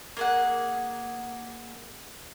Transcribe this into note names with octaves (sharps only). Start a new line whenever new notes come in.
A#3 G#4 F#5